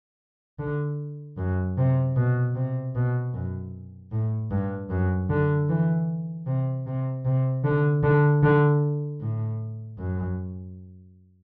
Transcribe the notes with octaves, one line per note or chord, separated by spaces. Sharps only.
D3
F#2
C3
B2
C3
B2
F#2
A2
G2
F#2
D3
E3
C3
C3
C3
D3
D3
D3
A2
F#2